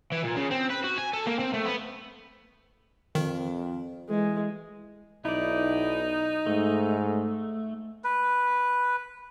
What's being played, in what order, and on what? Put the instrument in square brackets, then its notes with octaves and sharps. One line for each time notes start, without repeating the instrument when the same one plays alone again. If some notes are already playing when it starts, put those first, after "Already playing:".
[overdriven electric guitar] E3
A#2
C#3
C4
B4
F#4
G#5
A4
A#3
C4
A3
B3
[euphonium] F2 [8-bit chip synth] D#3
[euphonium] E3 [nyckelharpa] G#3
[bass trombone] B1 [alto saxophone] D#4 [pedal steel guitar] E4 D5
[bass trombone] G#2 [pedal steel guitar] A3
[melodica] B4